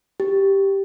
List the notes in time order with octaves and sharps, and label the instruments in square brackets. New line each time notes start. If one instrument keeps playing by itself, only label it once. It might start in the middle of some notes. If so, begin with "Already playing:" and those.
[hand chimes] G4